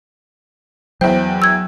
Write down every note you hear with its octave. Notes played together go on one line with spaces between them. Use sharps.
E2 F#3 E4 C5 G5
E6 G#6